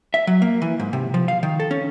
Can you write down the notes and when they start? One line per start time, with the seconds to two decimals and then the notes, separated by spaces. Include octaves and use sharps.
0.14 E5
0.27 F#3
0.42 A#3
0.62 E3
0.80 G#2
0.93 C3
1.14 F3
1.28 F5
1.43 D#3
1.60 A4
1.71 C#4